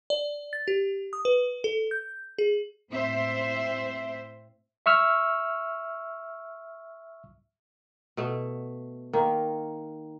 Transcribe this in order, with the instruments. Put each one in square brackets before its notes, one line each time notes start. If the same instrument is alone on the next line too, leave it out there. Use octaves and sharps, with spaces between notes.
[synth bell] D5
A6
G4
D#6
B4
A4
G6
G#4
[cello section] A2 C4 C5 E5
[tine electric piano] E5 C#6 E6 F6
[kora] B2 A3
D#3 A#3